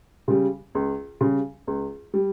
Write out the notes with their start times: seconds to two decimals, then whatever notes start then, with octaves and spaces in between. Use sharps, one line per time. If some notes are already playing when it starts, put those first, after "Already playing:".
0.28 C#3 G3
0.75 C#2
1.21 C#3 G3
1.67 C#2
2.14 G3